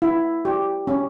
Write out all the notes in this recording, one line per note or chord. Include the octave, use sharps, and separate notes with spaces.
E4
G4
C#4